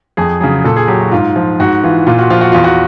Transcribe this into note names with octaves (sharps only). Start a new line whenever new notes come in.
F2 G#4
C#3 F#3 G#4
A#2 A4
G#4
F#3 G4
F#4
G#2 F4
F3 F4
G#2 F#4
E3 F4
A#2 F4
F#4
F3 F4
F#4
E2 F4
F#4